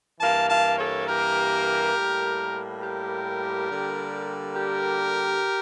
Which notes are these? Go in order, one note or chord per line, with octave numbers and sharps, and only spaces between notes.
G2 E3 A#3 F5 A5
F5 A5
A4 C#5
G4 A#4
A2 G3 A#3
G4 A#4
D3 G3 A#3
G4 A#4